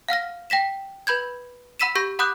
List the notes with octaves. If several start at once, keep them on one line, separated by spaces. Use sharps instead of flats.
F5 F#5 F6 A#6
G5 A#6 B6 E7
B4 B5 G6 G#6
F#5 B5 E6 B6 D#7 E7
G4 C#6 G6 A#6
F#5 B5 D6 D#6 F#6 G6